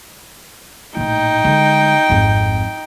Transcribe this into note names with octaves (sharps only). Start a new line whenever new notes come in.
A#1 A2 D#4 G5
D3 G#3
G#1 F2